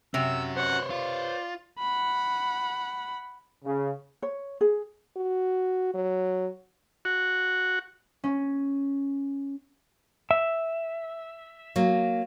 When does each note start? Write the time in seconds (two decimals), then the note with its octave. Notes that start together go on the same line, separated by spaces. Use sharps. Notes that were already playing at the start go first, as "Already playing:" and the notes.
0.14 C3 C#4 F#4 E6
0.57 C5 C#5 F#5
0.90 F4 D5
1.79 F#5 B5
3.65 C#3
4.22 C#5
4.61 G#4
5.17 F#4
5.94 F#3
7.05 F#4
8.24 C#4
10.31 E5
11.76 F#3 A#3